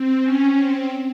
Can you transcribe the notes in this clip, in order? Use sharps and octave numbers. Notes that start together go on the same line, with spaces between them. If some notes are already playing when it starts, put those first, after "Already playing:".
Already playing: C4
C#4
C4